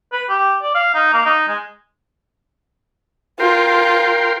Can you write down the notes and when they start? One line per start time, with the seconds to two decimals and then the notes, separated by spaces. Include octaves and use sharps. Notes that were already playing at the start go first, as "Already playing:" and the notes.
0.12 B4
0.29 G4
0.62 D5
0.75 F5
0.95 D#4
1.13 A#3
1.26 D#4
1.48 G#3
3.40 F4 A#4 G5 C6